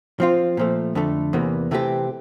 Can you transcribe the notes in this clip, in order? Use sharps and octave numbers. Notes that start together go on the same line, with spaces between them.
F3 C4 F4
A#2 F3 A3
F2 D3 A3
E2 C3 E3 A#3
C3 E3 A3 C4 G4